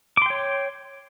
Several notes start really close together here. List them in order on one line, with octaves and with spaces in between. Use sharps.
D6 C6 G5 C#5